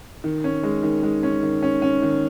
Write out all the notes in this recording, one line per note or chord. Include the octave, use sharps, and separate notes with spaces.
D#3
C#4
G#3
D#3
G#3
C#4
D#3
C#4
C#4
D#3